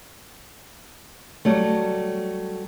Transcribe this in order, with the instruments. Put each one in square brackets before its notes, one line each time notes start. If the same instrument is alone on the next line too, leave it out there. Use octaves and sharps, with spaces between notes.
[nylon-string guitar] F#3 G3 A3